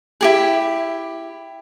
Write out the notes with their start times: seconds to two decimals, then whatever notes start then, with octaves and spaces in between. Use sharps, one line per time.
0.21 E4 G4 G#4